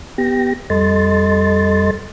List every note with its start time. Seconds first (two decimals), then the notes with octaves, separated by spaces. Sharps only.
0.18 B3 G4 G5 A#6
0.70 F2 G3 A4 D#5 C6 A6